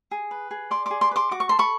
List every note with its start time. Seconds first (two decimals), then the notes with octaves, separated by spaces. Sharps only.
0.11 G#4
0.31 B4
0.51 G#4
0.71 D5 C6 D6
0.86 G#4 C6 D6
1.01 C6 D6
1.11 B4
1.16 C6 D6
1.31 F#4 D6
1.40 C#6
1.49 A4 C6
1.59 B5 C#6